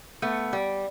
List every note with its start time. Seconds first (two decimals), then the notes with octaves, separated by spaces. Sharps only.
0.22 A3 B3
0.53 G3